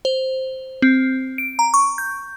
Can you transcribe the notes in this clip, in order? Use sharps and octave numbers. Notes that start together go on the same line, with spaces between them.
C5
C4
D7
A#5
C#6
G6